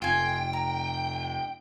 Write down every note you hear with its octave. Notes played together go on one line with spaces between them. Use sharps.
F1 F4 G5 G#5
A#5